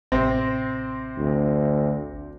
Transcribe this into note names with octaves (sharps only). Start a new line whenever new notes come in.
A1 C3 C4 A#6
D2